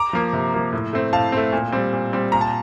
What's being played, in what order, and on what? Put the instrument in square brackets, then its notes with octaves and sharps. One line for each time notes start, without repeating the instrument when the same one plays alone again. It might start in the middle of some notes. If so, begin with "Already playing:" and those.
Already playing: [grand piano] A#5 D6
F3 A#3
C3
F3 A#3
A2
A3 C4
A2 F5 A5
A3 C4
A#2
G3 C4
A#2
G3 C4
A#2 A#5
A5